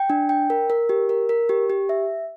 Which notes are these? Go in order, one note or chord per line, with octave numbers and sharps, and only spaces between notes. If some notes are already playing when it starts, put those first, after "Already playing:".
Already playing: G5
D4
G5
A#4
A#4
G4
A#4
A#4
G4
G4
E5